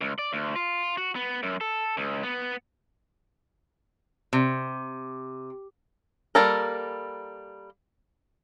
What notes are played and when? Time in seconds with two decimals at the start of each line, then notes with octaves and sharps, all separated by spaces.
0.01 C#2
0.18 D5
0.33 D2
0.56 F4
0.97 F#4
1.16 B3
1.43 F#2
1.61 A4
1.97 C#2
2.23 B3
4.33 C3
6.35 G3 A#3 A4 A#4